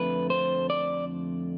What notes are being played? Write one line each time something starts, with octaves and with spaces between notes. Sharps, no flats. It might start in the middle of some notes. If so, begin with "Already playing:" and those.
Already playing: F2 D3 A3 B4
C5
D5